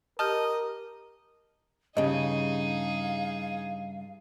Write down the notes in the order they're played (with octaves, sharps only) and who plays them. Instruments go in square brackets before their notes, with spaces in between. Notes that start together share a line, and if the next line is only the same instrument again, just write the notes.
[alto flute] G4 [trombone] A#4 [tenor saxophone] D#5 [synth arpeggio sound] A5 F6 G6
[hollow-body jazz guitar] G2 C#3 [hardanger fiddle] D#4 G#4 [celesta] D#5 [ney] F5